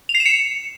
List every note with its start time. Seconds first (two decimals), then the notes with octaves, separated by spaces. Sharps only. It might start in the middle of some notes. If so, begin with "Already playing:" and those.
0.09 F7
0.15 C7
0.20 E7
0.26 C#7